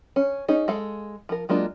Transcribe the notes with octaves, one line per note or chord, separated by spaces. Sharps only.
C#4
C#4 D#4 G#4
G#3 A4 F5
F3 A#4
F#3 G#3 A#3 D4 F4